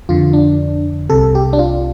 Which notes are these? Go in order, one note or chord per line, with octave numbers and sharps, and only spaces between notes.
F2 D3 F4
D4
C2 C3 A4
G4
D4
F4